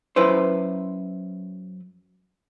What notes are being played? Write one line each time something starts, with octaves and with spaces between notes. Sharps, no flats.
F#2 E4 B4 C5